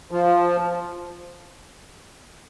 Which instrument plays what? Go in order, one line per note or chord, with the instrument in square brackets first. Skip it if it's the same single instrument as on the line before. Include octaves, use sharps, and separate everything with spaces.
[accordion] F3